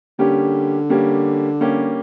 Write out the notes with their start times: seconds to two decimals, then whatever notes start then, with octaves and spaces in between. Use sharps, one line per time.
0.19 D3 G3 A#3 C#4 G4
0.90 G3 A#3 C#4 G4
1.60 G3 A#3 C#4 G4